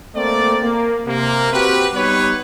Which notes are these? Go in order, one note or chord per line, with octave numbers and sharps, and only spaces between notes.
A3 A#3 C4 D5
A#3
C3 A#3
C4 F#4 G4 B4
G3 B3 D#4 B4 C#5